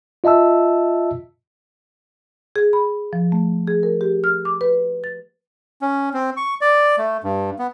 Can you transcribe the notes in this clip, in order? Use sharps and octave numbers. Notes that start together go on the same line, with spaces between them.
F4 D#5 E5 A5 E6
G#4
B5
F3
A3
G#4
A#4
G4
F6
D6
B4
A6
C#4
C4
C#6
D5
A3
G2
B3